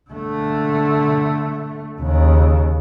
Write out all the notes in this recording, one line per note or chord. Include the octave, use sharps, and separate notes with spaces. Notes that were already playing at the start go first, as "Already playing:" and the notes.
D3 A3
D#2 C#3